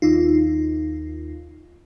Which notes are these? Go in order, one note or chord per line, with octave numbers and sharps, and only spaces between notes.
D#2 D#4 F4